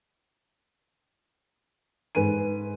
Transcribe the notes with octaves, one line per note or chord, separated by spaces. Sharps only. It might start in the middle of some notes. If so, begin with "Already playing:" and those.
G#2 B4 G#5 D#7